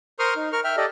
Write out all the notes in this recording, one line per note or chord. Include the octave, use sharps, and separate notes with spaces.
A#4 C5 C6 C#6 D#6 F6
D#4
A#4 C#6 F6
E5 G5 F6
G4 A4 D5 D#5